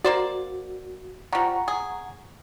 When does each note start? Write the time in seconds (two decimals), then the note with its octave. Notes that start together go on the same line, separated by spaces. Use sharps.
0.05 A#3 F#4 C5 D5
1.33 F3 G3 F#5 A#5 C#6
1.68 G#4